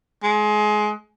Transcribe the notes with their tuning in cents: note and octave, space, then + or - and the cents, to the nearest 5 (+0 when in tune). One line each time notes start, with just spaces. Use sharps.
G#3 +25